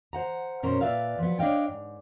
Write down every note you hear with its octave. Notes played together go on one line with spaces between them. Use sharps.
C5 F#5 A#5
F#2 B2 C#4 A#4 C5
A#2 B4 D5 E5 F5
F3 F#3 B3
D4 C#5 D#5 F5 G5
G#2